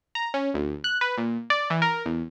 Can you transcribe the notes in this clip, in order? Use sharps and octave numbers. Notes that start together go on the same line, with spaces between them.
A#5
C#4
D2
F#6
B4
A#2
D5
E3
A#4
E2